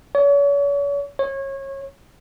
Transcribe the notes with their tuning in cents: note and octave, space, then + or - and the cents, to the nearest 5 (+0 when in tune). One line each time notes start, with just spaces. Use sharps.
C#5 +40
C#5 -25